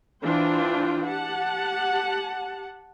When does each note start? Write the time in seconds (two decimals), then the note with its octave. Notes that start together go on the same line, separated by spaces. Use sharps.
0.23 E3 D4 F4 C5 G5
1.05 G4 F#5 A5